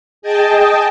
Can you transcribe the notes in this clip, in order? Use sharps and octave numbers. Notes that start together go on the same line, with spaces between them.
G#4 D#5 G5 A5